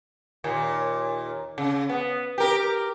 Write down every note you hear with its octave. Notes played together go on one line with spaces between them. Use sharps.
D#2 A#2
C#3
B3
G4 A#4